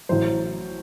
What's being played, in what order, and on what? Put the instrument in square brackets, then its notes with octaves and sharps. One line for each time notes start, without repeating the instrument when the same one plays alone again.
[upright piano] A1 A2 F#3 C5